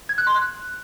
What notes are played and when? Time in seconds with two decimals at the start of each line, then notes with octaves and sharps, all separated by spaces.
0.09 G#6
0.18 F#6
0.27 C6
0.35 F#6